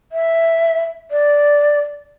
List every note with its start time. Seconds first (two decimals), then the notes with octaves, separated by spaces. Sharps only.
0.12 E5
1.11 D5